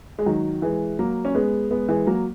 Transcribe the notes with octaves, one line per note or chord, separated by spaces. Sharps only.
G#3
D#3 F#3
E3 G#3
F#3 A#3
C#4
G#3 B3
G#3 B3
E3 G#3
F#3 A#3